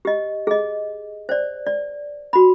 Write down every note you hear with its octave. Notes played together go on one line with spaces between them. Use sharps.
G4 D#5
G#4 D#5
C5 D5
D5
F#4 B5